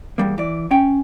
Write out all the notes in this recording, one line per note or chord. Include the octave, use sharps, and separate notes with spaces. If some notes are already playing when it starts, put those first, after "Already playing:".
E2 G3 A#3
E3 D5
C#4 G5